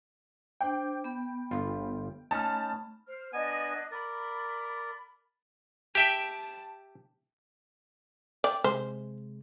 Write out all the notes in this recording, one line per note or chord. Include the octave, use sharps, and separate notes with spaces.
D4 C5 G5 D6
B3 B5
G1 F4
A3 C#4 D#4 A5 B5 F6
C5 F6
B3 D4 D#5 G#5
A#4 D5 B5
G4 E5 G5 A5
D5 G5
C3 G#3 C5